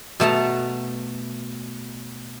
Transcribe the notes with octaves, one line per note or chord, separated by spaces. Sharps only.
B2 A3 A5 A#5